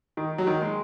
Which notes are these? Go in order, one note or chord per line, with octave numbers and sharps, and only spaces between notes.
D#3
F#3
D#3
G#3